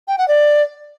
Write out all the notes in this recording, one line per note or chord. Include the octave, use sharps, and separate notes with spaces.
G5
F#5
D5